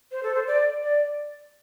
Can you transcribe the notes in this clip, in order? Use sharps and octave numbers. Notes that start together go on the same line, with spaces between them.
C5
A4
C5
D5
D5